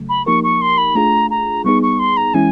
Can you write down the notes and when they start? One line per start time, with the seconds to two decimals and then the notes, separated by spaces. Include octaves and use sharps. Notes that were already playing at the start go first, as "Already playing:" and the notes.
Already playing: C#3 F#3 A3
0.09 B5
0.26 F3 A#3 D#4 G4 A#4 C#6
0.44 C#6
0.62 C6
0.78 B5
0.95 A3 D4 F4 G#4 A#5
1.31 A#5
1.65 G3 B3 D#4 G#4 C#6
1.83 C#6
1.99 C6
2.17 A#5
2.34 E3 G#3 C#4 E4 G#5